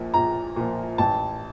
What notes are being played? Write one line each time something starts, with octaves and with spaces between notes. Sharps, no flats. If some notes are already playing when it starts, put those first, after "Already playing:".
Already playing: A#1 A#2 F3
A#1 A#5
A#2 F3
A1 A5